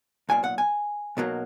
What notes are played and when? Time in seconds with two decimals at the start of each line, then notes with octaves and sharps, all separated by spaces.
0.29 B1 A#2 A#3 G#5
0.44 F#5
0.58 G#5
1.17 B1 B2 F#3 A#3